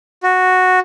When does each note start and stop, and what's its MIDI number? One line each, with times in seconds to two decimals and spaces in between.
0.23 0.80 66